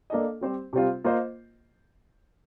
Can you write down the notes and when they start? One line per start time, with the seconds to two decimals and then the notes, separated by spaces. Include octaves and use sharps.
0.10 A#3 D4 A4 D#5
0.41 G3 C4 G4 C5
0.73 C3 G3 C4 F4
1.04 A#3 F4 C5 D#5